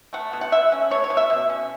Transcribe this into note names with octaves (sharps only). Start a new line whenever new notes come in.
A3 F#5
B2
F#5
B2 E5
C#4
A3 C#5
C#5
B2
E5
B2
C#4